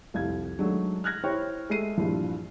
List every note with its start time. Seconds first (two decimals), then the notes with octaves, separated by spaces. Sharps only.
0.14 C2 F2 F5 G#6
0.58 D#3 F#3 G#3 A3 D4
1.04 F6 F#6 G#6 A#6
1.24 E4 C5 C#5 G5 C#6
1.70 G#3 A3 E5 C7 D#7
1.98 A#1 G2 E3 F3